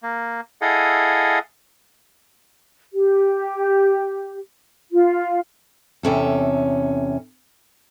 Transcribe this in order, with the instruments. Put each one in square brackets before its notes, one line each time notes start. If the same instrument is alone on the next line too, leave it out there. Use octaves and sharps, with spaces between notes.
[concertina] A#3
E4 G#4 A4 D#5 F5 F#5
[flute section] G4
F4
[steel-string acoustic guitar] E2 C3 C#4 A4